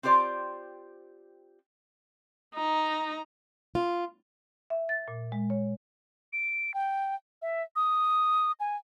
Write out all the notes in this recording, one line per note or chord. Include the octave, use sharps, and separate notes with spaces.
C4 F4 G4 C5 D5
D#4 A#5
F4
E5
A6
A#2
G#3
C#5
D7
G5
E5
D#6
G#5